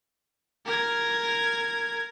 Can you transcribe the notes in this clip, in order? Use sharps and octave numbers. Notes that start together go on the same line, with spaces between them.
A#4 G#6